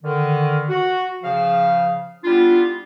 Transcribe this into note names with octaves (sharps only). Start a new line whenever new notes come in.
D3 D#3
F#4
C#3 F3 F5
G3 B3 D4 E4 F4